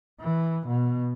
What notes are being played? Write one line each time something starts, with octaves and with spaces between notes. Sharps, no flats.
E3
B2